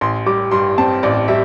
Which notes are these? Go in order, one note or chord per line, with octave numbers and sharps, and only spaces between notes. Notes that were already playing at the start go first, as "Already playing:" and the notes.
A1 C6
G3 D6
G2 C6
C4 A5
A1 D5
G3 E5